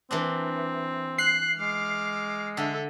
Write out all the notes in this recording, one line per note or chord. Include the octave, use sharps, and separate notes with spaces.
E3 A#3 C4 D4
F#6 C7
G#3 D6 F6
D3 A4 E5